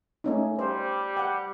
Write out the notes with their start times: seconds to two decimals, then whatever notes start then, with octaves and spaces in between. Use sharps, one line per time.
0.24 A3 C#4 D#4
0.59 G3 C5
1.17 F#5 G5